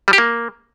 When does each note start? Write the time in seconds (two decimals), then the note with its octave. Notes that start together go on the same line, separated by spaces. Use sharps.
0.08 G3
0.13 G4
0.18 A#3